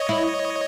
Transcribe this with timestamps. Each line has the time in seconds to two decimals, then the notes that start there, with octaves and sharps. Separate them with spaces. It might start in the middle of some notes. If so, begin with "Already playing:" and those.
Already playing: C#5 D#5
0.09 E4